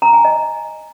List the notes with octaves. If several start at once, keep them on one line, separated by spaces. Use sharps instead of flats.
A#5
G#5
D#5